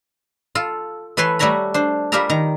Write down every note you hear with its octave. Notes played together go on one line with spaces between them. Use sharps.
F4 A4
E3 A4 B4 C#5 C6
G3 A3 F#4 C#5 A#5 B5
D4 C5
G3 F4 G4 A#4 E5 A#5
D#3 A#5